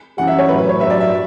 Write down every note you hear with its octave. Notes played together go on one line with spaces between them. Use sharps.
F#2 E3 G3 F#5
E5
C#5
A2 F#3 B4
B4
C#5
G2 F#3 E5
D5
E5
F#3